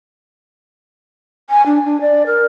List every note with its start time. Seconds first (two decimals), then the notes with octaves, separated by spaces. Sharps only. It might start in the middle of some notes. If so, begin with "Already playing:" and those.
1.50 G#5
1.66 D4
1.85 D4
2.01 D5
2.26 A#4